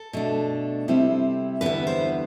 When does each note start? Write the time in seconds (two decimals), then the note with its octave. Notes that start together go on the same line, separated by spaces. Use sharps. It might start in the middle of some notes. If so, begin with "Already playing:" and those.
Already playing: A4
0.13 B2 A3 D4
0.88 C3 G3 C4 E4
1.61 E2 D3 G3 B3 E4 B4
1.87 C5